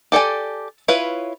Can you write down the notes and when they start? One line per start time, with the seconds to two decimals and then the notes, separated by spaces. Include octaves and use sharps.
0.12 G4 A4 D5 G#5
0.88 E4 F4 B4 C#5